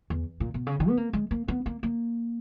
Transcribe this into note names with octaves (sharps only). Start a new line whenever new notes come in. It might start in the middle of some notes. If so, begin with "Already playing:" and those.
E2
A#2
B2
C#3
D#3
B3
A#3
G#3
A#3
B3
A#3
A#3